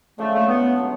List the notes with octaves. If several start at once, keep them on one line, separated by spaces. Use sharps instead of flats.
D3 F3 G#3 A3 C#4
A3
B3
A2 F#3 B3